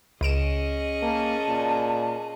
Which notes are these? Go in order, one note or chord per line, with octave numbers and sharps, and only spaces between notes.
C#2 C#4 G#4 D#5 D7 E7
A#3 A5
A#2